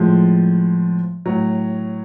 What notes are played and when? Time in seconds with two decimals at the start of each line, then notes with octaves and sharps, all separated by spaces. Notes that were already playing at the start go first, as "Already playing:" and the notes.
Already playing: A2 F3 G#3
1.26 A2 F#3